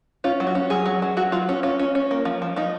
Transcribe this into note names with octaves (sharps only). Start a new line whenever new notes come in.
C#4 F4
F#3
F#4
C#4
F#3 G#4
F#3
F#3
F#3 F#4
F#3 F4
C#4
C#4 F4
C#4
C#4
A#3
F3
F3
F3 D#4